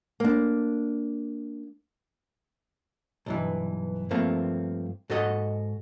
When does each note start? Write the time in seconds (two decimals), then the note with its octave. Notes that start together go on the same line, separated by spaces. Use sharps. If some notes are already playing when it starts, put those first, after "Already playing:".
0.20 A#3 D4
3.26 B1 G2 E3
4.11 G2 F3 A3 A#3 C4
5.10 G#2 F#4 A4 D#5 F#5